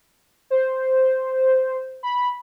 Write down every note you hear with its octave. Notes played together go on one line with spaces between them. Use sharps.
C5
B5